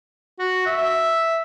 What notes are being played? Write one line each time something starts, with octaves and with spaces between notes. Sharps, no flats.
F#4
E5